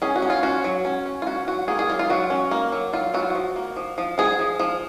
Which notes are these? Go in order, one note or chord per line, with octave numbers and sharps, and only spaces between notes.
C#4 G#4
F#4
C#4
F4
C#4 F#4
F#3
C#4
C#4
F4
C#4 F#4
F#3 F#4
A#3 G#4
G#4
F#3 F4
F4
F#3 F#4
C#4
A#3
F#3
F#3 F4
F#3 F#4
F4
F3 F#4
A#3
F3
F3
F3 G#4
F3
F3